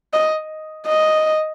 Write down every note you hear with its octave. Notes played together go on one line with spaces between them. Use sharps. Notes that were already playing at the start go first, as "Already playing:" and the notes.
D#5
D#5